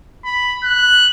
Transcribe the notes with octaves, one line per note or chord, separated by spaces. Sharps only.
B5
F#6